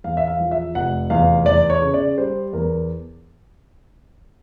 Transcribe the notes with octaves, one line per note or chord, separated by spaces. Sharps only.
E2 F5
E5
F5
F3
E5
F1 F#5
E2 F5
E2 D5
C#5
C#3
D5
G3 C5
E2 A#4